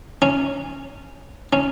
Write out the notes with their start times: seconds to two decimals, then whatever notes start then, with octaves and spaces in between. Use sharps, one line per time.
0.22 C#4
1.53 C#4